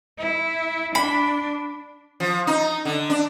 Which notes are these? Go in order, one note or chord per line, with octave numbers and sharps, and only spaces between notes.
E4
D4 B5
F3
D#4
D3
D4